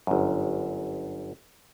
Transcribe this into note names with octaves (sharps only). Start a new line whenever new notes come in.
G1 F#2